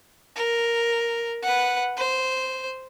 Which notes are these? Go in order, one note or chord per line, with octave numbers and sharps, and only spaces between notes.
A#4
B4 F#5
C5